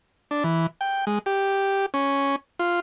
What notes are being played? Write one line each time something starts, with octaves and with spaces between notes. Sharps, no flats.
D4
E3
G5
G#3
G4
C#4
F4